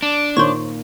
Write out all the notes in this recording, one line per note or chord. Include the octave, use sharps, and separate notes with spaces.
D4
A#2 D#3 A#3 C5 C#5